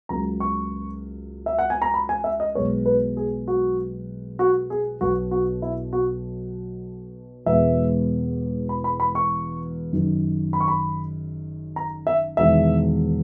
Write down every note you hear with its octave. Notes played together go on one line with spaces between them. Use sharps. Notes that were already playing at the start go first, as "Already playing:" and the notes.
C#2 C#3 F#3 A#3 A#5
C#6
E5
F#5
G#5
A#5
B5
G#5
E5
D#5
B1 B2 G#3 B3 C#5
B4
G#4
F#4
F#4
G#4
B1 B2 F#3 F#4
F#4
E4
F#4
E1 E2 B2 G#3 B3 E5
B5
B5
B5
C#6
F#1 F#2 D#3
B5
C#6
B5
A#5
E5
E1 E2 D#3 E5